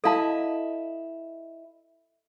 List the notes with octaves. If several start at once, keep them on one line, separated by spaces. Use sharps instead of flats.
E4 A4 D#5 F5 A5